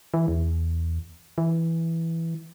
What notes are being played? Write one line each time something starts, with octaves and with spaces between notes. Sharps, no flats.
E3
E2
E3